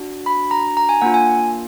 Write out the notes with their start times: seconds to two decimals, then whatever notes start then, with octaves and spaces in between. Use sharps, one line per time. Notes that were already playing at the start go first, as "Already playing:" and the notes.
Already playing: D4 F#4
0.26 B5
0.51 A#5
0.77 A#5
0.89 G#5
1.01 A#3 D4 F4 F#5
1.14 G#5